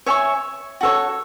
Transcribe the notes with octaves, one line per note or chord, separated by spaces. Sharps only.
C#5 E5 G#5 C#6
F#4 A4 C#5